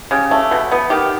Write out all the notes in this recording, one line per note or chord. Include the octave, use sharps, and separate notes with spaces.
C#3 G4
A3
B2
B3
D#3 G4